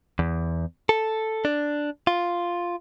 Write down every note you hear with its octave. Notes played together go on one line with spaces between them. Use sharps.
E2
A4
D4
F4